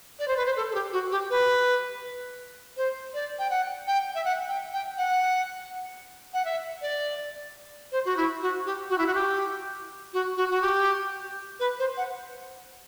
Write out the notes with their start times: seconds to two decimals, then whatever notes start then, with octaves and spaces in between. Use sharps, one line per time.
0.19 D5
0.28 C5
0.37 B4
0.46 C5
0.56 A4
0.70 A4
0.75 G4
0.93 F#4
1.11 G4
1.30 B4
2.77 C5
3.14 D5
3.39 G5
3.50 F#5
3.87 G5
4.15 E5
4.25 F#5
4.49 G5
4.73 G5
4.98 F#5
6.34 F#5
6.45 E5
6.82 D5
7.92 C5
8.05 F#4
8.17 E4
8.42 F#4
8.66 G4
8.90 F#4
8.98 E4
9.07 F#4
9.15 G4
10.13 F#4
10.37 F#4
10.51 F#4
10.62 G4
11.60 B4
11.79 C5
11.97 F#5